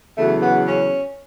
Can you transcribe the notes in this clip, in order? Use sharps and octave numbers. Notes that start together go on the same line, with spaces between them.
E2 C#3 F#3 A3
B3
C#4